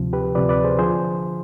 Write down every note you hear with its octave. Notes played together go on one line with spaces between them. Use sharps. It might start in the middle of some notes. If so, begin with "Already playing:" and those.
Already playing: D2 C3 F3
G4 B4
D2 C3 F3 B4 D5
B4 D5
G#4 C5
D3 F3 G#4 C5